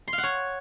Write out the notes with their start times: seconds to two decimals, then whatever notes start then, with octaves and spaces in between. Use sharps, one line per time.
0.08 C6
0.13 F5
0.18 F#5
0.23 C#5